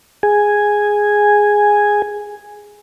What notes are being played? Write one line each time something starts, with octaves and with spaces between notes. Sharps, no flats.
G#4 G#5